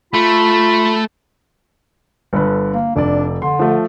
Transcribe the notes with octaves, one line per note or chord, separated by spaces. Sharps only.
A3 F4 B5
G1 D3 B4
A#3
F1 D4 D5
D3 C6
F3 A3